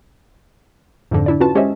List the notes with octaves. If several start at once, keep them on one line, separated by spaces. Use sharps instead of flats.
F2 G#2 D3
D4 E4 D5
C#4 F4 F#4 B4 A5
G#3 C#4 G4 C5 D#5 E5